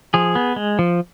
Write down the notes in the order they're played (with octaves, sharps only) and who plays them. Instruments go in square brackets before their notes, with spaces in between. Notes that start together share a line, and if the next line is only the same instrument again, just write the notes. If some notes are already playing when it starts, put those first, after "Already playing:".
[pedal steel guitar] F3 G#4
B3
G#3
F3